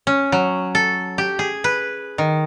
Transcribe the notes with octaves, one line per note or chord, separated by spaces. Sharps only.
C#4
F#3
A4
G4
G#4
B4
D#3